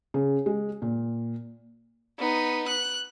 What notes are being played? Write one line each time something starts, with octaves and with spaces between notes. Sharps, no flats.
C#3
G#3
A#2
B3 D#4
F#6